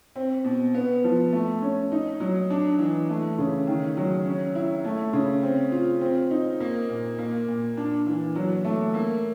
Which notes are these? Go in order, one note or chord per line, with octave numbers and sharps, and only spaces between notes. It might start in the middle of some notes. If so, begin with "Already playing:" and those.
C4
B2
B3
F3
A3
C#4
D#4
F#3
D4
E3
A3
C#3
D#3
F#3
C#4
E4
A3
C#3
C4
F4
C4
D#4
A#3
A#2
A#3
A#2
D4
E3
F#3
A3
A#3